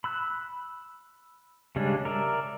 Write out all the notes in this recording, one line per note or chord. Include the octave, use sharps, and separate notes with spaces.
B5 E6 F#6
C#3 G3 G#3 C#4 D4
A#4 D5 E5